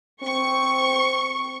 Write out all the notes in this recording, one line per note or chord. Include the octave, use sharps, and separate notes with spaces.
C4 C#6